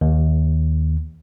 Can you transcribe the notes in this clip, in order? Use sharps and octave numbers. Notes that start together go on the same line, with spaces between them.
D#2